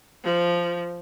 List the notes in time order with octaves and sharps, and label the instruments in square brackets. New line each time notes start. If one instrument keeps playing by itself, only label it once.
[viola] F3